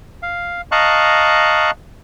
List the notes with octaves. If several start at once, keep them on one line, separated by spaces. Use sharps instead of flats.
F5
D#5 F5 A5 A#5 C#6 F#6